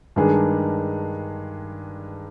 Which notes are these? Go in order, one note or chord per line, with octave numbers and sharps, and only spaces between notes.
G2 D#3 G#3 D4 G#4